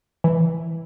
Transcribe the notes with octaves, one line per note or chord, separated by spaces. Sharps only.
E3